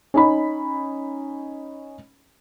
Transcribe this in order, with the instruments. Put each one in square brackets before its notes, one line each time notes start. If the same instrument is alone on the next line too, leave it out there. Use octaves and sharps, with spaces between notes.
[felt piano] C#4 D#4 B5